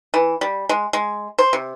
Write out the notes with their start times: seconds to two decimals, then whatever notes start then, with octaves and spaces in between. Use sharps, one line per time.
0.14 E3
0.41 G3
0.69 G#3
0.93 G#3
1.39 C5
1.53 C3